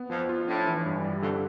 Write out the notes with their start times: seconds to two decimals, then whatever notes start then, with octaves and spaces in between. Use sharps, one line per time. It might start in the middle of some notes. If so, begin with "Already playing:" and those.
Already playing: B3
0.10 F2 F3
0.29 F4
0.47 A2 D4
0.67 E3
0.86 G2
1.04 G3
1.22 F2 D3